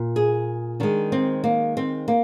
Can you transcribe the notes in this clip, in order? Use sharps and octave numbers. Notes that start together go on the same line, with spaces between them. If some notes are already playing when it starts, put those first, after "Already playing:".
Already playing: A#2
G#4
D#3 G#3 D4
C4
A#3
C4
A#3